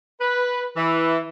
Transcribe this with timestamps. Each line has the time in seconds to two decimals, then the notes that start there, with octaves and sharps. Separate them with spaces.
0.21 B4
0.77 E3